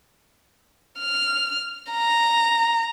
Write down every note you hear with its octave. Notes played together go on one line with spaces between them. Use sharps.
F6
A#5